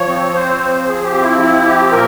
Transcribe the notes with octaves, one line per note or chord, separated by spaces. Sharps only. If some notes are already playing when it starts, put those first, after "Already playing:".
Already playing: F3 C#5
C4
C4 C5
F3
F3 G#4
G4
C4
E4
F3 E4
C4 G4
A#2 A#4